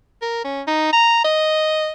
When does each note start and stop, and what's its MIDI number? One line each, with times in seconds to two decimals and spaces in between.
0.22 0.43 70
0.44 0.62 61
0.67 0.88 63
0.92 1.24 82
1.24 1.92 75